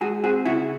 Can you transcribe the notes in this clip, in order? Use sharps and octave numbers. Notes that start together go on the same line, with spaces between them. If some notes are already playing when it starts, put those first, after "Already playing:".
G#3 F#4 G#4
C4 F#4 G#4
C#3 E4 F#4